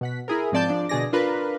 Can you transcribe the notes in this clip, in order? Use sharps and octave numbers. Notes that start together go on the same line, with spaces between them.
B2 F#5 B6
E4 G#4 A#4
G#2 F3 C4 D5 A5 G6
F3 D4 D5
B2 D3 G#4 D5 A#6
D4 F4 A#4 B4